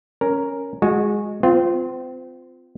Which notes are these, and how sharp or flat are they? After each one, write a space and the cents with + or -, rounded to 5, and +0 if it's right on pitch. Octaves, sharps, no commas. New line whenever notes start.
C#4 +0 A#4 +0
G#3 +0 F#4 -20
C4 -35 F4 +0